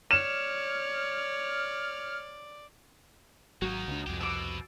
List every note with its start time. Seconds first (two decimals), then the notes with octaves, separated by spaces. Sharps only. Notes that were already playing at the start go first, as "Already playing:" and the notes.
0.11 C#5 D5 F6 E7
3.62 G#1 F#3 A#3 D#4 F#4
3.88 C#2 D4
4.06 C2 F2 G#3 G4
4.21 B2 D6 E6